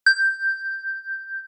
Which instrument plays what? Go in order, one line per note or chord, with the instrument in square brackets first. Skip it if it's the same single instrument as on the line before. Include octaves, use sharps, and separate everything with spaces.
[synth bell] G6